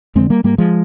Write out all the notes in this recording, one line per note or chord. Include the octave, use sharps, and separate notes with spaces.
F2 D3 G#3 C4
G3 A#3
G#2 G3 A#3
F3 G#3